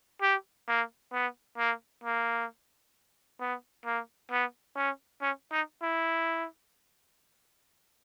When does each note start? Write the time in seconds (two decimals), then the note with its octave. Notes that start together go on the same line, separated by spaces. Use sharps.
0.21 G4
0.68 A#3
1.13 B3
1.58 A#3
2.04 A#3
3.40 B3
3.86 A#3
4.31 B3
4.76 C#4
5.22 C#4
5.52 D#4
5.82 E4